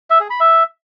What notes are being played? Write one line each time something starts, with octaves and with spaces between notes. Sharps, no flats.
E5
G#4
B5
E5